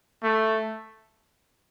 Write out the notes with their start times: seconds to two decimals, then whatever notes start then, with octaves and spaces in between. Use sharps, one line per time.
0.23 A3